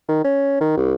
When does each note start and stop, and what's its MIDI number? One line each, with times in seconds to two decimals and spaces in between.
0.09 0.21 51
0.24 0.56 61
0.60 0.72 51
0.77 0.94 36